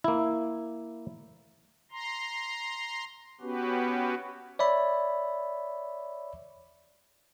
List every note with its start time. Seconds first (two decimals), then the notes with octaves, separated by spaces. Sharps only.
0.04 A#3 E4
1.91 A#5 C6
3.41 B3 C#4 F#4 G4 B4
4.59 C#5 D5 E5 B5